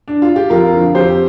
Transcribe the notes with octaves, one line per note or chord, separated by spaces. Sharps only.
D4
F4
G4
F2 F4 A#4
D3 F3
F2 G4 C5